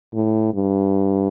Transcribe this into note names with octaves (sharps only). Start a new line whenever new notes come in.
A2
G2